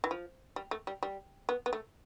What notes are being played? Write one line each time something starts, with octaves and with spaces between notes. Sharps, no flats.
E3
F3
G3
A3
G3
G3
B3
B3
A3